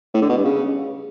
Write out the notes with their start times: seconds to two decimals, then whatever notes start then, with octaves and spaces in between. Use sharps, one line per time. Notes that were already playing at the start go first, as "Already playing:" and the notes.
0.14 A2
0.22 D3
0.29 B2
0.37 G2
0.44 C#3